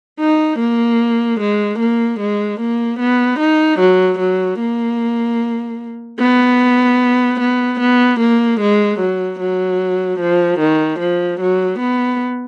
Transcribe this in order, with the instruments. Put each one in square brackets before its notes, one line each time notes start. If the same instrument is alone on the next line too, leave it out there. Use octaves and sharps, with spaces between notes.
[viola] D#4
A#3
G#3
A#3
G#3
A#3
B3
D#4
F#3
F#3
A#3
B3
B3
B3
A#3
G#3
F#3
F#3
F3
D#3
F3
F#3
B3